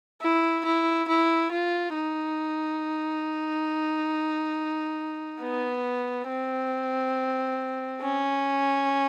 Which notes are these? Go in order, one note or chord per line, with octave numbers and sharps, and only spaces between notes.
E4
E4
E4
F4
D#4
B3
C4
C#4